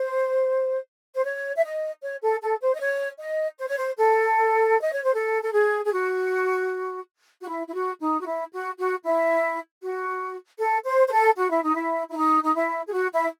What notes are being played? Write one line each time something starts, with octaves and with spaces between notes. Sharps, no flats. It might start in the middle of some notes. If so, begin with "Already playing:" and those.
Already playing: C5
C5
C#5
E5
D#5
C#5
A4
A4
C5
D#5
C#5
D#5
C5
C#5
C5
A4
D#5
C#5
C5
A4
A4
G#4
G#4
F#4
F#4
E4
E4
F#4
D#4
F#4
E4
F#4
F#4
E4
F#4
A4
C5
C5
A4
F#4
E4
D#4
E4
E4
D#4
D#4
E4
G#4
F#4
E4